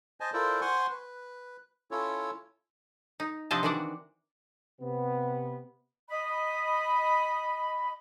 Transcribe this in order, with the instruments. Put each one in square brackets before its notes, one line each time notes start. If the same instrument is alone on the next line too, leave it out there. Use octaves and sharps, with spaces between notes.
[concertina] C5 D#5 G#5 A5
E4 F4 A4 A#4 C5 D5
C5 F#5 G#5 C6 C#6
B4
C#4 E4 F4 A4 C#5
[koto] D#4
C3 F3 C4 D4 D#5 A5
D#3 E3 D4 F#4 D5 F#5
[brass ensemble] C3 B3
[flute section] D#5 B5